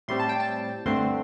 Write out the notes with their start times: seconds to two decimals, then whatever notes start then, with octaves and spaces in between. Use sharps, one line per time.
0.08 A2 G3 C4 C6
0.19 A5
0.29 G5
0.40 A5
0.86 G2 D3 A3 C4 C6